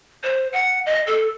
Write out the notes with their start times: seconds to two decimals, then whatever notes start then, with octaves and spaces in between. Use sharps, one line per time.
0.24 C5
0.53 F#5
0.86 D#5
1.07 A4